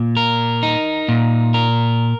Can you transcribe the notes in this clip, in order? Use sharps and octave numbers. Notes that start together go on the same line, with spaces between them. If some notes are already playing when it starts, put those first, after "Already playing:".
Already playing: A#2
A#4
D#4
A#2
A#4